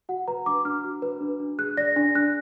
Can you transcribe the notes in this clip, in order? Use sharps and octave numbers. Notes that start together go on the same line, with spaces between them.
F#4 F#5
B4 A#5
D4 D6
D4 F6
F#4
B4
D4
D4
G#4 F#6
D5 A#6
D4 A#6
D4 F#6